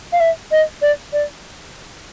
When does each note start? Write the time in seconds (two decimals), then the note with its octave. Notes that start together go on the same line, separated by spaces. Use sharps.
0.12 F5
0.20 E5
0.51 D#5
0.82 D5
1.13 D5